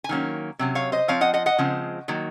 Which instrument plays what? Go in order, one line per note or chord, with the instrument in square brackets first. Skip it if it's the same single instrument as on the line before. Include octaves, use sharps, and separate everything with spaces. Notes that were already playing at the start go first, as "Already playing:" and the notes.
[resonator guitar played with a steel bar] G#5
D#3 F#3 A#3 C#4
C3 F#3 C#4
C#5 F5
C5 D#5
F3 C4 C#5 F5
D#5 F#5
D#5 F#5
D#5 F#5
C#3 F3 G#3 C4
D#3 F#3 A#3